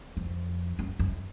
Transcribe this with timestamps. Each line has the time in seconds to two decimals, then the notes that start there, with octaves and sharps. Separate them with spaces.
0.17 F2
0.79 F#2
0.99 F#2